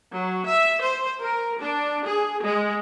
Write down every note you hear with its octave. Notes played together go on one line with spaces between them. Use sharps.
F#3
E5
C5
A#4
D4
G#4
G#3